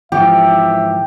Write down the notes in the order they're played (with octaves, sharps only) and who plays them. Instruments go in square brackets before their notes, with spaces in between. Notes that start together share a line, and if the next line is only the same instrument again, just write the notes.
[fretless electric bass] G#1 E3 F3 [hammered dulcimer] G4 [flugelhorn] E5